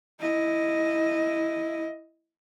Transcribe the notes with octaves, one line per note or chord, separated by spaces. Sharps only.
E4 D#5